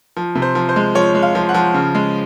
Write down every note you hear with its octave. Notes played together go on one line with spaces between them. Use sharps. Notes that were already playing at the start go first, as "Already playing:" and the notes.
F3
C3
C5
F3
C5
G#3
F3 C#5
G#3
F5
F3
F#5
F3
C#3
G#3